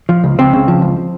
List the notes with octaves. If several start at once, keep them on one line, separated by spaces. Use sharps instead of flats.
F3
C#2
C#2 C4
C#3
F3
C#2